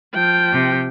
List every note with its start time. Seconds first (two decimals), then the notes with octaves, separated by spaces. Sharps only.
0.15 F3 G5
0.52 C3